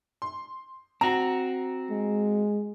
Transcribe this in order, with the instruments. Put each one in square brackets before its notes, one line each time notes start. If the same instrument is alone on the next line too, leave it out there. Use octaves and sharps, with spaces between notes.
[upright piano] C6
[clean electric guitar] C4 F#4 [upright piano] A#5
[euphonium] G#3